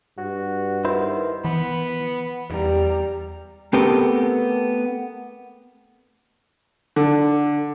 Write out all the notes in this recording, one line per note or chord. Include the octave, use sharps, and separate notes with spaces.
G2 F#4
D#3 E4 B4 C5
E3 B3 B5
E2 G3 A#5
A3 B3 C4 G4 A4 A#4
D3